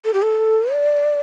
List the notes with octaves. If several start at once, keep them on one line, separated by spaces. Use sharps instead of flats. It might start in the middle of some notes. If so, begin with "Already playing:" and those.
A4
G4
A4
D5